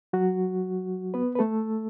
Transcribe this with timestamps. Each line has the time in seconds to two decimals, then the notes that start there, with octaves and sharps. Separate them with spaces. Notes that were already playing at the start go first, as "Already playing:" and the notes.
0.13 F#3 F#4
1.14 B3 B4
1.35 B4
1.39 A3 A4